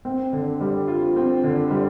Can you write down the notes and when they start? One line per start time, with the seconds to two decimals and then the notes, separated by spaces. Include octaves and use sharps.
0.05 C4
0.33 D3
0.61 G3
0.88 F4
1.16 C4
1.44 D3
1.71 G3